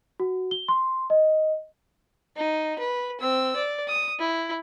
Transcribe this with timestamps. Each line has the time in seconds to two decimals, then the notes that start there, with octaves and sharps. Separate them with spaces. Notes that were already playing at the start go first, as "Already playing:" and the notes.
0.20 F#4
0.51 G7
0.68 C6
1.10 D#5
2.36 D#4
2.79 B4
3.20 C4 E6
3.56 D5
3.88 D#6
4.19 E4